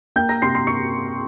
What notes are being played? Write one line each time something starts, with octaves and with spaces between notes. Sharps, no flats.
A#3 G5 G6
A#5 A#6
C3 C6 C7
C6 C7
A#3 C#6 C#7